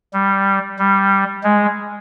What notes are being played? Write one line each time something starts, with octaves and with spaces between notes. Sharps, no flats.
G3
G3
G#3